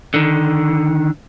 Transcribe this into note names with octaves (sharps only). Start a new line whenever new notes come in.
D3 D#3